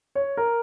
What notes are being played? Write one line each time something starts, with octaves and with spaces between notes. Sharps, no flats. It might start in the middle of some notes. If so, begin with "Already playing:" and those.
C#5
A#4